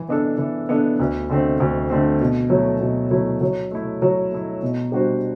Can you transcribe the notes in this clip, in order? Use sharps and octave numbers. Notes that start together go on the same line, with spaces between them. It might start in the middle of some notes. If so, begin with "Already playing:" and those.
Already playing: E3
B3 D4 A4
E3
B3 D4 A4
D2
D3 A3 C4
D2
D3 A3 C4
B2
F#3 A3 E4
B2
F#3 A3 E4
F#3
A3 E4
F#3
A3 E4
B2
G3 D4 F#4 C5